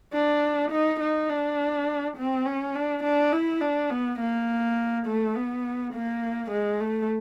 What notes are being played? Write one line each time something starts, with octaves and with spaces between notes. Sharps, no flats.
D4
D#4
D#4
D4
C4
C#4
D4
D4
E4
D4
B3
A#3
A3
B3
A#3
G#3
A3